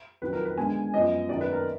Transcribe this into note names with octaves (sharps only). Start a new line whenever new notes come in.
F2 D#3 F#3 B4
A#4
B4
D3 G#3 B3 G#5
F#2 F3 B3 D#5
F#2 D#3 A#3 D5
B4
A#4